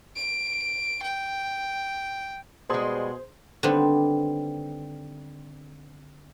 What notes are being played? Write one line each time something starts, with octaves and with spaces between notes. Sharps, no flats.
D7
G5
B2 G3 G#3 G#4 C5 C6 D#6
D3 D#3 G3 B3 C4